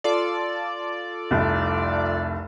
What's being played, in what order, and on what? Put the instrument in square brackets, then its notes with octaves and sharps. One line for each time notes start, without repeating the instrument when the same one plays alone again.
[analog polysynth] F4 A4 D5
[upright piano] F1 C2